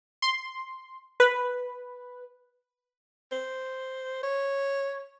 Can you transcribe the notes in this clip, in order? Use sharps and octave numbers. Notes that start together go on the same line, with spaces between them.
C6
B4
C5
C#5